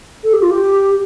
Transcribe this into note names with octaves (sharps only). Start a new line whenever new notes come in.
A4
G4
F4
G4